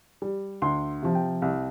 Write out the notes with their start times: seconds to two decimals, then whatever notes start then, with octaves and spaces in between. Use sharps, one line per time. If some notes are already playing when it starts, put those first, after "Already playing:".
0.22 G3
0.62 D2 C6
1.02 C3 F3
1.15 G5
1.42 C2